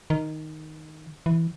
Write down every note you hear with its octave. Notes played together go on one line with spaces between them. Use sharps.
D#3
E3